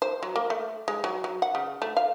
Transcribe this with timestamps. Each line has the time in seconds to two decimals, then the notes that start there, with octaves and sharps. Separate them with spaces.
0.02 C5
0.23 F#3
0.36 A#3
0.50 A3
0.88 G#3
1.04 F#3
1.24 F#3
1.42 F#5
1.55 C#3
1.82 A3
1.97 F5